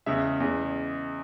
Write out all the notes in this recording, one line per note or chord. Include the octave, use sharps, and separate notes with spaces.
E2 C#3 G#3 E5
E2 C#3 G#3